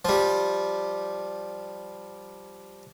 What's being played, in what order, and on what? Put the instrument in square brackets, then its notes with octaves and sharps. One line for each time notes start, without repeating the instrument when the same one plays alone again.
[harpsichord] F3 G3